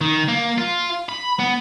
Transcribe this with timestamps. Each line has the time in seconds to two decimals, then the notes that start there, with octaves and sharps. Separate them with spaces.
0.01 D#3
0.28 A#3
0.58 F4
1.09 B5
1.39 B3